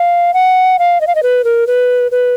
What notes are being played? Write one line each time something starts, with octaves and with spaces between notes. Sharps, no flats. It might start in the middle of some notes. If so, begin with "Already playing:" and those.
Already playing: F5
F#5
F5
D#5
F5
D#5
B4
A#4
B4
B4